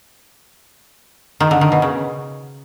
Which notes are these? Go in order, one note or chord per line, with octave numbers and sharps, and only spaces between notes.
D#3
D3
D#3
B2
C#3